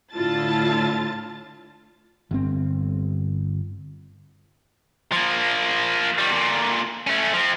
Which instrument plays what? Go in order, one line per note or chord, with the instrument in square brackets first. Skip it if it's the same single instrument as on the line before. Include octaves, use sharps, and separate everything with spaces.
[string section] A2 D3 E4 F4 A5 A6
[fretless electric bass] G1 C4
[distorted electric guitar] F3 A#3
D#3 G3
A#2 D3
A3 C#4
F3 C4